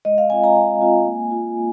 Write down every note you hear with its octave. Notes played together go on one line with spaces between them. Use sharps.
G#3 D#5
F5
C4 F4 G#5
A#5
G#3 G#5
C4 F4
A#3
F4
A#3